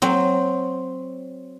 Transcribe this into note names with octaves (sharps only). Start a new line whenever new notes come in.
F#3 C4